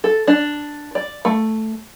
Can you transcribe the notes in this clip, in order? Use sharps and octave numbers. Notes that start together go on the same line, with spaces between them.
A4
D4
D5
A3